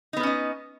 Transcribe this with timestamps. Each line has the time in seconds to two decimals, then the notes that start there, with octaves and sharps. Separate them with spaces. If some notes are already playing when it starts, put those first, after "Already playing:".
0.13 D#4
0.17 B3
0.20 B4
0.23 C#4
0.27 D#5